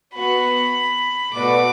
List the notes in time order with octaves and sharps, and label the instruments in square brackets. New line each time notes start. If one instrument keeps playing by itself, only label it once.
[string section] B3 F#4 B4 [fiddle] B5
[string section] B2 A3 F#4 B4 D5 [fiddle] D6